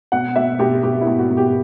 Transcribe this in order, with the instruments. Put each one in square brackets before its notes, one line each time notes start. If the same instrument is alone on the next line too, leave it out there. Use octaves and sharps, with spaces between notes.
[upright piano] B2 F#5
B2 E5
B2 G4
B2 G4
E4
B2
F#4
B2
G4